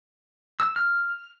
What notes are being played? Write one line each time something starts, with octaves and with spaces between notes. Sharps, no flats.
E6
F6